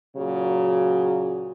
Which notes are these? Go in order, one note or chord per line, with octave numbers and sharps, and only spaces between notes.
A#2 C#3 F#3 F#4